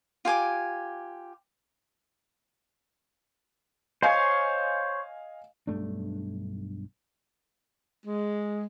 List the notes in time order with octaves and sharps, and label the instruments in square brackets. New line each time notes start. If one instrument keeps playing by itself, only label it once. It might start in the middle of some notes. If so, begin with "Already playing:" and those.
[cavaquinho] F4 G4 G#5 D6
[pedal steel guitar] C5 C#5 [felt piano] D#5 F5 G#5
[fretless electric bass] B1 G2 A3 D4
[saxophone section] G#3